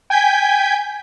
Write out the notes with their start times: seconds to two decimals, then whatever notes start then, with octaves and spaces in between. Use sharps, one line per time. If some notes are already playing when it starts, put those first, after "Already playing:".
0.10 G5 G#5 G6 G#6 B6